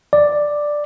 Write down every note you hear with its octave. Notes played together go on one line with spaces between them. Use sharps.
D5